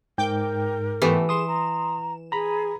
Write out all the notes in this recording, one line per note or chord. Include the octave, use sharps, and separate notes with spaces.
G#2 A#4 G5 D6 G6
E3 A3 B3 G4
G#4 C6 D#6 E7
A#5
G#4 A#5 B5